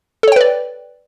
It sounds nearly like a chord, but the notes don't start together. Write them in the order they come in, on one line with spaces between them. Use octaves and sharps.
A4 C#5 G5 B4 D5